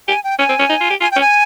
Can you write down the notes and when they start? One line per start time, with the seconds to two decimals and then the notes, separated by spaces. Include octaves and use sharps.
0.08 G4 G#5
0.24 G5
0.39 C#4 G#5
0.49 C4
0.59 C#4
0.70 D#4
0.80 F4
0.90 G4
1.01 F4 G#5
1.11 C#4 G5
1.21 G#5